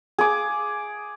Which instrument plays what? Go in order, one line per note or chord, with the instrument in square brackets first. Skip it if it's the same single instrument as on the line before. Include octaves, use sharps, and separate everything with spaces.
[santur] G#4 D6